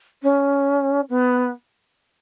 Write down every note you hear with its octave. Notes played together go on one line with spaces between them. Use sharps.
C#4
B3